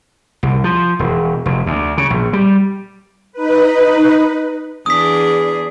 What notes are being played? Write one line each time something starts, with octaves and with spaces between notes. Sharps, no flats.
C2
F3
E1
F1
D2
C#3
A#1
G3
D#4 B4
E2 D4 G#4 D#6 B6